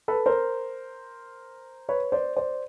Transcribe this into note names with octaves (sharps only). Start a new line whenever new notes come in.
A4 B4
A#4 C5
B4 C#5
C5 D5
C5 D5